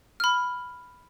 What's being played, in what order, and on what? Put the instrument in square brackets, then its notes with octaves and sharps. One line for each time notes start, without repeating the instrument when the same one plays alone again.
[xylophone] B5 F6